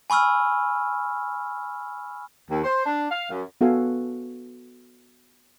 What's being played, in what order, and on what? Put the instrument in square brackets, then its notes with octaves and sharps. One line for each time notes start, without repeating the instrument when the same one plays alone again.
[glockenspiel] G#5 B5 C#6 E6 F6
[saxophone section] D#2
C5
D4
F5
F#2
[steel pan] B3 F#4 A4 F5 G#5